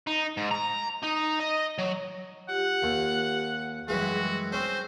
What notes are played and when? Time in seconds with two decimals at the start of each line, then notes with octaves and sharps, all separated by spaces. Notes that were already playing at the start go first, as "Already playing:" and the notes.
0.07 D#4
0.37 G#2
0.51 A#5
1.03 D#4
1.39 D#5
1.78 F#3
2.49 F4 G4 F#5
2.82 D#2
3.88 F#2 E3 G3 G#3 F#4 G#4
4.52 C4 C#4 C5